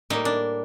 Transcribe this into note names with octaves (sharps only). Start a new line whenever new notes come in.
A2 G3 A#3 D#4
D4